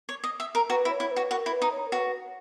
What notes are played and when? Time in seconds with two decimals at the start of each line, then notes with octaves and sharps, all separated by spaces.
0.09 C#5
0.24 D#5
0.40 E5
0.55 A#4
0.70 F#4 B4
0.85 E4
0.90 C#5
1.00 E4
1.11 B4
1.16 F#4
1.31 F#4 A#4
1.46 E4
1.52 B4
1.62 D#4
1.72 C#5
1.88 A#4
1.92 F#4 B4